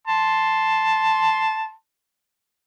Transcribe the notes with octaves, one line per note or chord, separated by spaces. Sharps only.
A5 C6